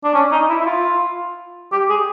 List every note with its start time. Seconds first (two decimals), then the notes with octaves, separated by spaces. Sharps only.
0.04 D4
0.14 C#4
0.32 D#4
0.49 E4
0.60 E4
0.66 F4
1.72 G4
1.89 G#4